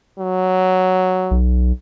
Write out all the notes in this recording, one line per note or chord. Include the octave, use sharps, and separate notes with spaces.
F#3
B1